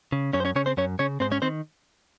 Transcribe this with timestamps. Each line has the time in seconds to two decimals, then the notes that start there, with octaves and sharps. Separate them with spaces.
0.12 C#3
0.33 F#2 C#4 C#5
0.40 C5
0.45 C#4 C#5
0.56 C#3 C#4 C#5
0.66 C4 C5
0.77 F#2 C#4 C#5
0.99 C#3 C#4 C#5
1.20 G#2 C4 C5
1.32 C#4 C#5
1.42 D#3 C4 C5